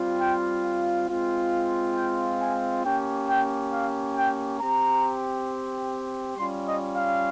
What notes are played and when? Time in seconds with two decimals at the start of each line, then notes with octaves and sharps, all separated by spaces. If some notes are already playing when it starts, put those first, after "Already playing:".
Already playing: G3 C4 F4
0.19 G5
0.64 F5
1.08 G#3 C4 F4
1.95 G5
2.39 G#5
2.84 A#3 C#4 G4 G5
3.28 G5
3.72 F5
4.16 G5
4.60 C4 G4 A#5
6.37 G3 C#4 F4 C6
6.67 D#5
6.95 F5